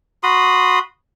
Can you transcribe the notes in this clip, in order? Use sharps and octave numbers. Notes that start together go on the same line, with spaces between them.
F#4 B5 C6 D#6